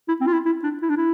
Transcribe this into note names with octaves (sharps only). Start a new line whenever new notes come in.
E4
C4
F4
E4
E4
D4
E4
D4
E4